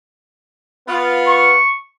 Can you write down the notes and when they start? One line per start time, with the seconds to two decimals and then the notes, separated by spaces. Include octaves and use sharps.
0.86 B3 F4
1.27 C#6